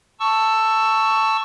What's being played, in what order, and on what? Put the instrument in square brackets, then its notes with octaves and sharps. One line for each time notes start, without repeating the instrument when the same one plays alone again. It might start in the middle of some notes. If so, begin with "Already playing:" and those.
[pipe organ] A5 C#6 E6